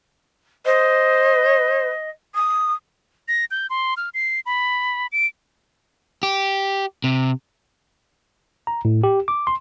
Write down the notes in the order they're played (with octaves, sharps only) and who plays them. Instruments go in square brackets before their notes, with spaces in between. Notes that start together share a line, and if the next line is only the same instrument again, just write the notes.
[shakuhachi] C5 [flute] D#5
[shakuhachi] D#6
[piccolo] A#6
G6
C6
F6
C7
B5
D7
[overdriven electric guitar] G4
C3
[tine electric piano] A#5
A2
G4
D6
C6